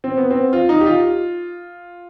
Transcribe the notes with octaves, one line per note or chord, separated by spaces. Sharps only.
C4
B3
C4
F4
D#4
G4
F4